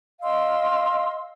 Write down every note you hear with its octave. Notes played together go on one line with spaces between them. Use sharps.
D#5 F5 C6 E6